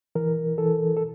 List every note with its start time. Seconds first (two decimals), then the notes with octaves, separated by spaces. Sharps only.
0.15 E3 A#4
0.58 E3 A4
0.97 A4